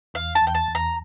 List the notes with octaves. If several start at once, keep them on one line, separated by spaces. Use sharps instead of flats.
E2 F5
A5
E2
G5
A5
E2
A#5